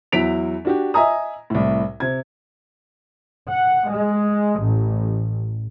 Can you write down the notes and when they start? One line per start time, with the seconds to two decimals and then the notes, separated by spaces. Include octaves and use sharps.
0.12 E2 F#3 E4 B6 D7 F7
0.65 D4 F#4 G4
0.94 D#5 E5 G#5 A#5 D#6
1.50 C2 A2
2.00 C3 G#6
3.51 F#5
3.88 G#3
4.59 A1